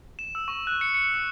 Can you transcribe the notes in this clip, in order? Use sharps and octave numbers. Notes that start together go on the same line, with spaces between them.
E7
E6
C#6
F#6
C#7
C#7
E7